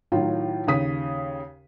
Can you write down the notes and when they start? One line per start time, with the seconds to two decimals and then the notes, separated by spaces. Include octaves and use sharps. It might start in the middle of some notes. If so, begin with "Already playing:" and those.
0.12 A2 D#3 F#3 F4
0.67 D#2 C#3 D#6 B6